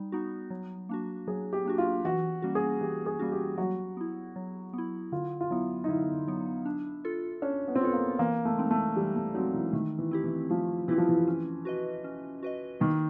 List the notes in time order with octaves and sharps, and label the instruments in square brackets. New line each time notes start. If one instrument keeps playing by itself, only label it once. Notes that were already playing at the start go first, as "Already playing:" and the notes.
Already playing: [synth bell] G3 D#4
B3 D#4 F#4
F#3
A#3 D4 F#4
[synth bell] F#3 [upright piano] G#4
[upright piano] G4
[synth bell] A#3 D4 F#4
[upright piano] F4
[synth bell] E3 [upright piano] F#4
[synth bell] G3 A#3 C#4 F#4
[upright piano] G#4
[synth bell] E3 [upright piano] G4
[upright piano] G#4
[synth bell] G3 A#3 C#4 F#4
[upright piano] G4
[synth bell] F#3 [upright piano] F#4
[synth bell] B3 E4
F#3
B3 E4
[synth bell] D3 [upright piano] F4
[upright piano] F4
[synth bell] F#3 B3 [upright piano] E4
[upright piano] D#4
[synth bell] D3 [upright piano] E4
[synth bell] F#3 B3
D4
F4 A4
[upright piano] C#4 [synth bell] D4
[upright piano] B3
C4
[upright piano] B3 [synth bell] F4 A4
[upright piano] A#3
[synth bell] E3 [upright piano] A#3
[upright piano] A3
[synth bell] G#3 C4 D#4
[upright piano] A3
[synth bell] E3 [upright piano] G3
[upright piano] A3
[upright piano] F#3 [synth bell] G#3 C4 D#4
[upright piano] E3
[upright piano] D#3 [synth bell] A3
[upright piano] E3
[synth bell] C4 E4 G4
[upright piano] E3
[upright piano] F3 [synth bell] A3
[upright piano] E3 [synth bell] C4 E4 G4
[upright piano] F3
E3
[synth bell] C#4
F#4 B4 D#5
C#4
F#4 B4 D#5
[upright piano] D#3 [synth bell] A#3